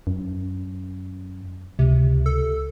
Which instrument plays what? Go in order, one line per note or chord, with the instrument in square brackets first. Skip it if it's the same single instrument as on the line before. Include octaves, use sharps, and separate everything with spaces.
[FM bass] F#2
[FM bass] C#2 [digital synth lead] C3
[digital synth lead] A4